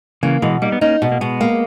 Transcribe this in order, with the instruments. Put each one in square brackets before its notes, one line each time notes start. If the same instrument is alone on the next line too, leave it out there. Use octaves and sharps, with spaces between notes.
[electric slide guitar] C#3 E3 [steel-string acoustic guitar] A#3
[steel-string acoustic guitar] B2 [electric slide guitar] E3 G#3
[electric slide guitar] G3 A#3 [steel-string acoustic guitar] D#4
[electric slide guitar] B3
[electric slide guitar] A#3 C#4 [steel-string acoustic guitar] D#4
[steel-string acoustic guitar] B2 [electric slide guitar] B3
[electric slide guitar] A#3
[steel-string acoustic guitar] B2 [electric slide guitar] G#3 B3
[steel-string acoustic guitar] A#3